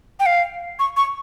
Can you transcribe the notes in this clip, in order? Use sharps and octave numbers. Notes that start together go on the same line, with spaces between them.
G5
F5
C#6
C#6